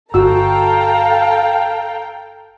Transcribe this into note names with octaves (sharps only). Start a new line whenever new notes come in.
G1 F#4 A4 F5 G5 A5 A#5 E6